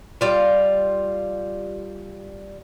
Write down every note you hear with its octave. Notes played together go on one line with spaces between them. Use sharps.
G3 F4